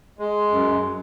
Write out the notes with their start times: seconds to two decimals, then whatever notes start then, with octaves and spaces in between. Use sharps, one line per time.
0.19 G#3
0.51 F#2